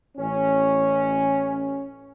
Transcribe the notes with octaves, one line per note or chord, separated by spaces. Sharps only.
A1 C#4